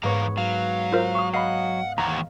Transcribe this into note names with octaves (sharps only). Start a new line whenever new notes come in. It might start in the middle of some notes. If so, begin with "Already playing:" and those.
E2 G#2 B3 C#5 F5 A#5
F#3 F5
F4 A#4 C5
C#6 D#6
D#5 F5 F#5 B5 C7
D#2 G#2 E3 F#5 A#5